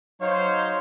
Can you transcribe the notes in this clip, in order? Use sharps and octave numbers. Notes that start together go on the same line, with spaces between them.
F#3 D#4 C5 C#5 F5